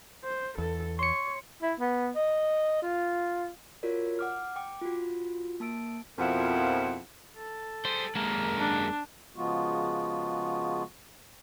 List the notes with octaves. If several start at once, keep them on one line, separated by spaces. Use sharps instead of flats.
C5
E2 A4
C#5 C6 C#6 C#7
E4
B3
D#5
F4
F4 F#4 A#4 C#5 D5
F#5 D6 F6
G5 D6
F4 F#4
A#3 A5 E6 D7
F2 B2 F3 E4 A#4 F#5
A4
G3 G#4 C5
F#2 G#3 A#3 A#4 A5
D4
C#3 F3 G#3 B3 F4 F#4